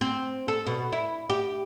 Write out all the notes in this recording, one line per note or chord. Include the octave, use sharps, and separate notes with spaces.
C4
A4
B2
E4
G4